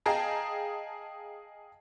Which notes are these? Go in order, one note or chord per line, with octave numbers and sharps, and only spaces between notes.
G#4 D#5 F5 G5 A5 A#5